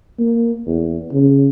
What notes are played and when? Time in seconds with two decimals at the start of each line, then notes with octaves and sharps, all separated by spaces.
0.18 A#3
0.66 E2
1.12 C#3